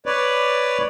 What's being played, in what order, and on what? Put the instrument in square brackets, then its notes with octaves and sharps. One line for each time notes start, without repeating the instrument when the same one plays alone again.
[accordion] B4 C#5 D5